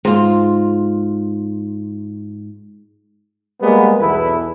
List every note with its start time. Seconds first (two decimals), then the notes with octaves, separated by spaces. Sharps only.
0.05 G#2 F4
3.61 G3 G#3 A#3 B3
3.99 B1 E2 B3 E4 A4 B4